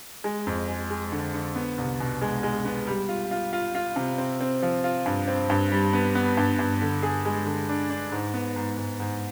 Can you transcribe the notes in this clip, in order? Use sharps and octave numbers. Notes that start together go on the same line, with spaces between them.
G#3
F2
G#3
G#3
D3
D3
B3
C2
B2
G#3
G#3
B3
G3
F4
F4
F4
F4
C3
C4
C4
F3
F4
G2
C4
G2
G3
B3
B3
G2
G2
D3
G#4
G#3
D3
D4
D4
G#2
B3
G#2
G#2
G#2